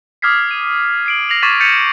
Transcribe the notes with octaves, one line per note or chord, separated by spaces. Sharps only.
D6 D#6 F6 G#6 B6 C7
D#7
C7 D7 F#7
A#6 C7 F7 F#7
C#6 D6 G#6 A6 B6 D#7
G6 A6 B6 C#7 D#7 F7